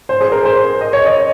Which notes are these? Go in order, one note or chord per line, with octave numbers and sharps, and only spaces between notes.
C5
G#4
A#4
C5
D#5
C#5
D#5